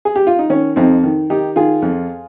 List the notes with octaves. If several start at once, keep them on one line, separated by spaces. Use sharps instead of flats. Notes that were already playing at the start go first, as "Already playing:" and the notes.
G#4
G4
F4
D#4
D#3 C#4
F2 C4 D#4
D#3
D#3 D#4 G4
D#3 F4 G#4
F2